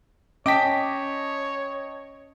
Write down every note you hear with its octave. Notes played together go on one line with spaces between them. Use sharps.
C#4 C#5 D#5 G5 A5 D6 B6